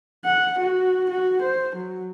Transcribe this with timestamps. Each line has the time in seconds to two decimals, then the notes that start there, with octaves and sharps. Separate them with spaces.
0.25 F#5
0.59 F#4
1.10 F#4
1.42 C5
1.76 F#3